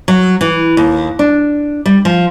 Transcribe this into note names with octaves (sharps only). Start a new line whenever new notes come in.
F#3
E3
D#2
D4
G3
F3